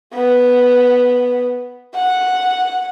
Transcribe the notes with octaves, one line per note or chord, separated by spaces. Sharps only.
B3
F#5